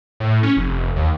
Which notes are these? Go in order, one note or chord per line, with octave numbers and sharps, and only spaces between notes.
A2
C#4
F1
F1
D#2